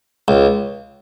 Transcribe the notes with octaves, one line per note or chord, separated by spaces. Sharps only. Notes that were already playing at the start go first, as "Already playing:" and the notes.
C#2